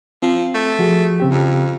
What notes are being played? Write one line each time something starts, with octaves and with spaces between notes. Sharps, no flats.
F3 C4
A3
F3 F#4 G#4
C#3 C4 G4
F2